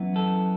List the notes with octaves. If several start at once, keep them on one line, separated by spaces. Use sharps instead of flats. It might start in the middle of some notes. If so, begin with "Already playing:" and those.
Already playing: F#2 E3 B3
A4